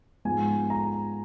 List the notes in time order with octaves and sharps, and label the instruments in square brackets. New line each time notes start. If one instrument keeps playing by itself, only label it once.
[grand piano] G#2 F3 G#3 B3 G#5
A#5